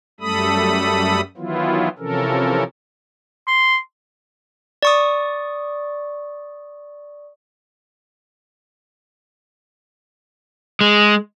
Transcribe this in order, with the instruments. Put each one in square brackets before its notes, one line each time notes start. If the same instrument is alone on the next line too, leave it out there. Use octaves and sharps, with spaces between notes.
[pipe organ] F#2 G3 A3 A4 B5 D#6
D#3 E3 F#3 B3 E4 F4
C3 E3 F3 C#4 A4 A#4
[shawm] C6
[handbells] D5 C#6 D#6
[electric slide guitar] G#3